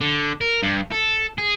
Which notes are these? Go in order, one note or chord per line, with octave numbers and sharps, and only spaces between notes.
D3
A#4
G2
A4
G#4